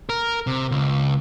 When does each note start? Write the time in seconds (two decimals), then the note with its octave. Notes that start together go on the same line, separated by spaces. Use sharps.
0.09 A#4
0.47 C3
0.71 C#2